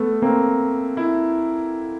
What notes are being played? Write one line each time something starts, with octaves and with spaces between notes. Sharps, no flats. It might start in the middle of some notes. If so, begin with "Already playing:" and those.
Already playing: A3 B3
A#3 C4
E4